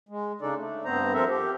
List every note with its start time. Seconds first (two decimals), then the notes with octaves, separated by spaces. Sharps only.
0.09 G#3
0.41 C#3 D4 D#4 A4 D5
0.57 A3
0.85 G2 B3 C4 C5 A#5
1.13 F3 C4 A4 A#4 E5
1.29 G4